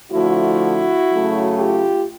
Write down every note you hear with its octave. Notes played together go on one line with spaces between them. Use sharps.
D3 F3 A3 E4 F#4
C#3 F#3 A3
F4 G4